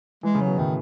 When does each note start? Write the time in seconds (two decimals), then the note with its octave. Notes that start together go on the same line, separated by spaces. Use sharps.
0.23 E3 G#3
0.35 C#3
0.41 F#3
0.47 B2
0.58 A2 D#3